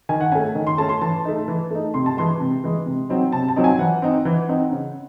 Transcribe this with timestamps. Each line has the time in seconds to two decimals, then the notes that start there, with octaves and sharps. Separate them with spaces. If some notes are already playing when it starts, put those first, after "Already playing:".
0.09 D#3 G#5
0.21 F#5
0.32 A3 C#4 G#5
0.55 D#3
0.67 C6
0.78 A3 C#4 A5
0.89 C6
1.01 E3 A5
1.25 A3 D#4
1.48 E3
1.71 A3 D#4
1.94 C3 C6
2.06 A5
2.17 E3 G#3 C6
2.40 C3
2.64 E3 G#3
2.86 C3
3.09 F#3 C4 D#4
3.32 C3 A5
3.48 A5
3.56 F#3 C4 D#4
3.64 G#5
3.79 E3 F#5
4.02 C4 D#4
4.25 E3
4.49 C4 D#4
4.71 C#3